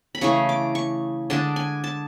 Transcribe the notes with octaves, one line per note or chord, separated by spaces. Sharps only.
B5
C#3 E3 A3 C#6
D6
C#6
D3 G#3 D4 A5
G#5
A5